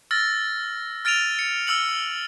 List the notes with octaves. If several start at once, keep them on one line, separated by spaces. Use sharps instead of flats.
E6 F6 A6 A#6
F6 A6 D7 D#7 F7
C#7
E6 F6 C#7 F#7